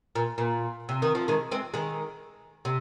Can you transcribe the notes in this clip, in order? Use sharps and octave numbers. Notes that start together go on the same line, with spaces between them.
A#2
A#2
C3
D#3
F3
D#3 G#3
G#3 C4
D#3 G#3
C3